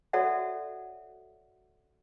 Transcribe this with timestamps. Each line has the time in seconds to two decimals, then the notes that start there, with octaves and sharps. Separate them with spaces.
0.13 F#4 A4 C#5 D5 E5 F#5